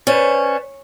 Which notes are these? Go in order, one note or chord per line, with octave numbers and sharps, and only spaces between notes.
C#4 B4 C5 D5